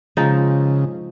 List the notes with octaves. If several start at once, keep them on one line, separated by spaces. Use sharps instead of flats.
C#3 F3 G#3 D#4